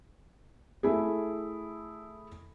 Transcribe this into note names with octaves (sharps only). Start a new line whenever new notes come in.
A3 E4 G#4